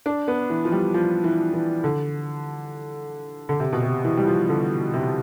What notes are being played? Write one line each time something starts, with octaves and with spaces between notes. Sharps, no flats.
D4
B3
E3
F3
G3
F3
E3
E3
D3
D3
C3
B2
C3
E3
G3
F3
D3
C3